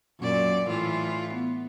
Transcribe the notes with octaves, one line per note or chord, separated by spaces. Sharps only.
F#2 A#2 D5
A2 E3 F4
B3